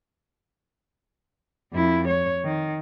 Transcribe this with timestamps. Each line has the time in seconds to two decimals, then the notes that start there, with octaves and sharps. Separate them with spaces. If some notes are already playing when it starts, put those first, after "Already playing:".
1.73 F2 E4
2.07 C#5
2.45 D#3